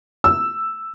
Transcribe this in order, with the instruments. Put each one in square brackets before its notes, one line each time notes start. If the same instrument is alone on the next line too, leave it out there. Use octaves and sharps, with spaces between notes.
[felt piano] E6